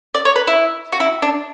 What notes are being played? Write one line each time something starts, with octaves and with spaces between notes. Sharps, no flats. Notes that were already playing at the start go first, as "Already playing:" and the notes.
D5
C#5
B4
E4
F#4
E4
D4